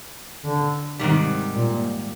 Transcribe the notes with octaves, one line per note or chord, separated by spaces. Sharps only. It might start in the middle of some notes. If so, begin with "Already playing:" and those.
D3
G#2 C3 D#3 G3
A#2